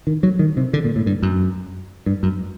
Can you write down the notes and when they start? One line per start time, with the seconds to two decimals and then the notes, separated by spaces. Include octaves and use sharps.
0.07 D#3
0.23 F#3
0.39 D#3
0.57 C3
0.73 D3
0.84 A#2
0.96 A2
1.06 G2
1.23 F#2
2.06 G2
2.23 F#2